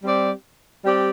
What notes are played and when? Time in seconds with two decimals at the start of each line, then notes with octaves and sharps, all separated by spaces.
0.03 G3 C4 G4 D5
0.84 G3 C4 G4 D5